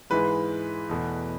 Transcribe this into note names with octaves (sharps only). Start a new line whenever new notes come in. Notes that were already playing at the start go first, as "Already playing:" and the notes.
G#2 E3 G#3 B4
E2 B2 A3